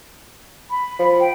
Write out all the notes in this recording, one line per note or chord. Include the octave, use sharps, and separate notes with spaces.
B5
F3
G5